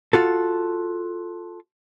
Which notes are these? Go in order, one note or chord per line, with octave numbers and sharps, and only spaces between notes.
F4 F#4 A4